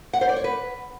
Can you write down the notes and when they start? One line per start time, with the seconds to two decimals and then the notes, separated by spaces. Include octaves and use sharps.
0.13 F#5
0.21 C5
0.29 D5
0.36 C#5
0.44 B4